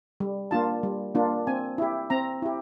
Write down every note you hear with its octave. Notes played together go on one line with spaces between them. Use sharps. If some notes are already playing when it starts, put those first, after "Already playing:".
G3
A#3 D4 F4 A5
G3
A#3 D4 F4
C4 G#5
E4 G4
C4 A#5
E4 G4